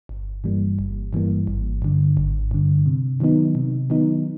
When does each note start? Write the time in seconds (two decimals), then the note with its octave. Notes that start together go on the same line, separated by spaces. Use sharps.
0.09 G1
0.44 G2 E3 G3 A#3
0.79 G1
1.13 G2 E3 G3 A#3
1.47 G#1
1.82 G2 D3
2.17 G#1
2.51 G2 D3
2.86 C3
3.20 D#3 F#3 B3 D#4
3.55 C3
3.90 D#3 F#3 B3 D#4